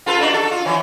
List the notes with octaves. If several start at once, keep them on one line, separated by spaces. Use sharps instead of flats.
F4 A4 B4
D4 D#4 F#4
F#4 A4
F4
E3 F#3